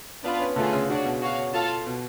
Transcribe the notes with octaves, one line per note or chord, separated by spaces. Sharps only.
B3 D4 F4 B4 F5
C#4
D3 A3 F4 G#4
C#3
C#3 D4 F#4 C#5
B2
F#4 C#5 F5
F4 A4 F5 A5
B2